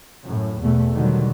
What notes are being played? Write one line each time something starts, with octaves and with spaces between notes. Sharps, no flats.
F#2 A2
E2 B2 A3
B2 D3 D#3 F#3 G3